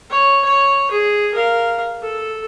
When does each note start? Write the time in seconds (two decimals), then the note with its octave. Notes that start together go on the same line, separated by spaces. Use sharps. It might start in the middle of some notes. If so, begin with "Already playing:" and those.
0.10 C#5
0.45 C#5
0.91 G#4
1.34 A#4 F5
2.02 A4